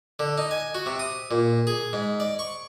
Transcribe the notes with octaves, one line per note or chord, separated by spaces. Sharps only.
D3
D#4
G#5
F#4
C3
D#6
A#2
G#4
G#2
D5
C#6